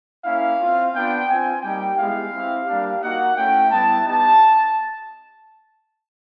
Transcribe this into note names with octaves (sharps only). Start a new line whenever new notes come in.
A#3 C#4 E4 F5
C4 F4
B3 D4 F4 G5
C4 F4 G#5
G3 A#3 D#4 G4 G5
G#3 B3 E4 G4 F5
C4 E4 G4
G3 A#3 D4 G4 F5
A#3 D#4 F#4 F#5
A3 C#4 E4 G5
G3 B3 E4 A5
B3 D#4 G4 A5